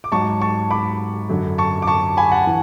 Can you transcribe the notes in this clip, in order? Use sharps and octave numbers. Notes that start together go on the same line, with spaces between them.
D6
G#2 F#3 A5 C#6
A5 C#6
B5 D6
F#2 D3 F#3
A5 C#6
D6
A5 C#6
G#5 B5
F#5 A5
E3